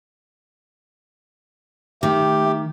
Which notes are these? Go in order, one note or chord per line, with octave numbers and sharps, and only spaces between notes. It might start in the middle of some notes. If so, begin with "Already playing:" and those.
D#3 A3 G4